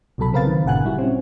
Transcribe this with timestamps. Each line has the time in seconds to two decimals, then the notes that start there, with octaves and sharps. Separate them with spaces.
0.18 C2 B2 F#3 A4 B5
0.33 C#3 C4 A#4 B4 F5 A6
0.47 D#3
0.65 G1 A#2 C#3 F#5 G#5 F#6
0.85 G3 E4 F#4
0.99 C4 C#4